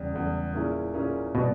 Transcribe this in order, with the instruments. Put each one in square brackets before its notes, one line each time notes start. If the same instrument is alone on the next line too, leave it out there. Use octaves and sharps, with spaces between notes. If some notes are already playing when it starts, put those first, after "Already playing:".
Already playing: [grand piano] E2 C#3 G3
E2 C#3 G3
A#2 A#3 C#4 E4 G#4
A#2 A#3 C#4 E4 G#4
[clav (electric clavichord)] B2 [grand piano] G3 B3